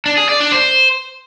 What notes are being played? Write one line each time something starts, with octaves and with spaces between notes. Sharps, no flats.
D4
G#4
D5
D4
C5